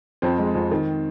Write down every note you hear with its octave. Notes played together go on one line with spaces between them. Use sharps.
F2 C4
G#3
F2
D#3